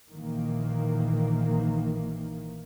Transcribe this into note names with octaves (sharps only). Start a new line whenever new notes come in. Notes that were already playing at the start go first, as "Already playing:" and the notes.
A#1 A#2 D#3 E3 A#3